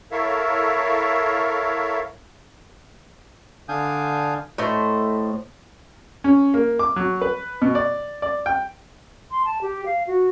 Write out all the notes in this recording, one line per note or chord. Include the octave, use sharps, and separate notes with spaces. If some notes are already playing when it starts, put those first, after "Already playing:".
E4 A4 A#4 C#5 E5 F5
D3 D4 F5 G#5 D#6 G6
A2 A3 C5 D#5
C#4
A#3
D6
F#3
B4
B2
D5
D5
G5
C6
A5
G4
F5
F#4